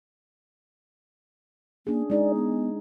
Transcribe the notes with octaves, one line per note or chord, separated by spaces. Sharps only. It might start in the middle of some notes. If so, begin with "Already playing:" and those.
A#3 C#4 D4 G#4
G#3 D#4 G#4 D5
B3